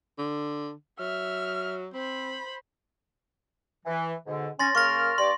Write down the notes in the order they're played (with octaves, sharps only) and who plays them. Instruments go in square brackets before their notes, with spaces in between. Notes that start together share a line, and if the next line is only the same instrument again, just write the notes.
[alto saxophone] D3
[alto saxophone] F#3 [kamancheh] E5 F6
[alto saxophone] C4 [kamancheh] C5 B5
[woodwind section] E3
G#2 B2 D3
[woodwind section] C#4 [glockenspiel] C6 A6 A#6
[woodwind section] C#3 A#3 F6 [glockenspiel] C#6 A#6
[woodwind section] G2 D5 [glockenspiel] C6